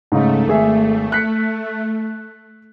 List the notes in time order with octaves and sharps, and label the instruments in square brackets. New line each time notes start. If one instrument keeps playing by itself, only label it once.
[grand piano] G#2 C#3 D#4 [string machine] A3
[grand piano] G#1 G#4 E5
F#6 B6 C#7